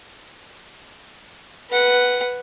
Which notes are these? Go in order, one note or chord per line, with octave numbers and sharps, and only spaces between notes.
B4 F#5